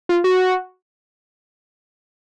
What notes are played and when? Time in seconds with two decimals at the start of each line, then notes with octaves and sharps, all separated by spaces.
0.09 F4
0.24 F#4